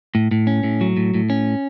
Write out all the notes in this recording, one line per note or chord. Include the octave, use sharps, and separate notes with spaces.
A2
A2
C#4
A2
F#3
A2
A2
C#4